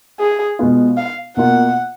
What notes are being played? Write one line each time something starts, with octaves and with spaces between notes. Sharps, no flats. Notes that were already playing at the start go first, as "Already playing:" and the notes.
G#4
B2 G#3 B3 F4
F5
B2 A#3 F4 F#5